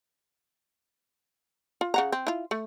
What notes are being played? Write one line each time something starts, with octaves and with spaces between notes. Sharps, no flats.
F4
C#3 F#5 A#5
C4
E4 F4
A3